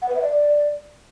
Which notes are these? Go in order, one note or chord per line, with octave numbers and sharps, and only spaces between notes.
F#5
B4
E5
D5